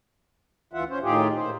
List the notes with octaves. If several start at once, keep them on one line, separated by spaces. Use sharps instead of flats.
D2 E3 F4 E5 F#5
C#4 C5
A2 D#3 F4 G4 G#4
A#2 C5